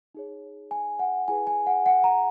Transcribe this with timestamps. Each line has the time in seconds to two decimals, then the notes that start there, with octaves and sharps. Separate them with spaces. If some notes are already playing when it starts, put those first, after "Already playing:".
0.15 D#4 G#4 C#5
0.71 G#5
0.99 F#5
1.28 E4 G#4 B4 G#5
1.47 G#5
1.67 F#5
1.86 F#5
2.04 A#5